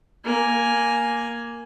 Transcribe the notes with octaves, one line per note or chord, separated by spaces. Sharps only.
A#3 G#5